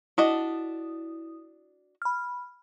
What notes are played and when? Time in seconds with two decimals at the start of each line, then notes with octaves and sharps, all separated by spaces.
0.18 D4 E4 F#4 D#5 D#6
2.02 B5 F6